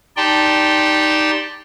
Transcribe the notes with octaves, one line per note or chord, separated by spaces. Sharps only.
D#4 G4 D5 G5 A5 C6